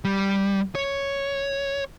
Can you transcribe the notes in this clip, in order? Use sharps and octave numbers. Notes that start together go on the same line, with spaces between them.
G3
C#5